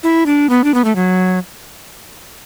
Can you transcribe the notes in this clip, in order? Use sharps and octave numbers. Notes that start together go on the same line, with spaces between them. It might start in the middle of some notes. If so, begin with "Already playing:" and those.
E4
D4
B3
D4
B3
A3
F#3